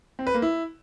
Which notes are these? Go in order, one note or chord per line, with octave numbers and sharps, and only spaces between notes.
C4
B4
A#3
E4